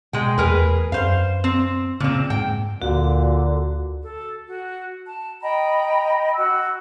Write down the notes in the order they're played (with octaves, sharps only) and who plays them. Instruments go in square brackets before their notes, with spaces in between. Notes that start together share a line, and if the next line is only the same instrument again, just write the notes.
[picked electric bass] B2 [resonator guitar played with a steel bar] G#3 G5
[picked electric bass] E2 A3 [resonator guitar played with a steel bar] G#4 A#4 B4
[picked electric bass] F#2 [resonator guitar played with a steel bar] C5 F5
[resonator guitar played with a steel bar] C4
[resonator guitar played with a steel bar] A#2 C4 [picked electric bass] C#3
[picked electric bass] G#2 [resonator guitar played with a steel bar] G5
[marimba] D2 [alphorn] A#2 [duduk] D3 [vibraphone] F#4
[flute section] A4
F#4
A5
D#5 G5 A#5 B5
F#4 E6